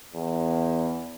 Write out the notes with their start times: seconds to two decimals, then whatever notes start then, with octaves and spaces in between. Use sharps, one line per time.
0.14 E2